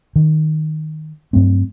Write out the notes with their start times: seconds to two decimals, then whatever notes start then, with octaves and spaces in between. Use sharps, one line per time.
0.16 D#3
1.33 G2 F#3 A3 C4